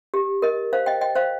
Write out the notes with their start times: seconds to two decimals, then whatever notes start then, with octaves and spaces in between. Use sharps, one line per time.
0.14 G4
0.42 A#4 D#5
0.73 C5 F5
0.86 D#5 G5
1.01 D#5 G5
1.15 C5 F5